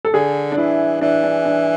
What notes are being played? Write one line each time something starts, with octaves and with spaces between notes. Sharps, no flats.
A4
D3 G#4
D4
E3 E4
E3 D4
D4
D4